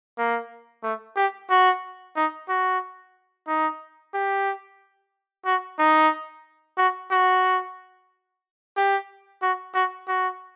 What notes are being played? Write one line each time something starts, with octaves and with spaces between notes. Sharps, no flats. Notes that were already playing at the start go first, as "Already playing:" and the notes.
A#3
A3
G4
F#4
D#4
F#4
D#4
G4
F#4
D#4
F#4
F#4
G4
F#4
F#4
F#4